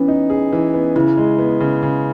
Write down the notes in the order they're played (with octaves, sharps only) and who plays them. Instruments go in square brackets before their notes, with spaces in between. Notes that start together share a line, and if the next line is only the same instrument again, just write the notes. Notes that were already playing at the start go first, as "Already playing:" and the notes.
Already playing: [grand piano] E3 B3 [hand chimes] C#4
[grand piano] D#4
G#4
E3
B3
[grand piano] C#3 [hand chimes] E4
[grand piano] G#3
B3
C#3
C#3